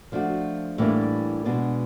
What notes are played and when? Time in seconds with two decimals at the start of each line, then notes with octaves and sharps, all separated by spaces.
0.12 F3 A3 D4 F#4
0.78 A2 E3 G3 A#3 D4
1.45 B2 G#3 B3 D4 F#4